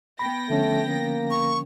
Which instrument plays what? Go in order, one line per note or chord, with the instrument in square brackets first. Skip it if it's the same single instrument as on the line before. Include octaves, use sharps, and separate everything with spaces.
[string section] B3 G5 A#6 [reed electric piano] B5
[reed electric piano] D3 F3 C#4 [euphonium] A3
[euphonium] A#3
[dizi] C#6